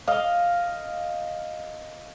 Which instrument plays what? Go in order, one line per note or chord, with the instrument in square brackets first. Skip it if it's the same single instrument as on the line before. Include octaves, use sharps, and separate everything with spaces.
[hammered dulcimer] D#5 F5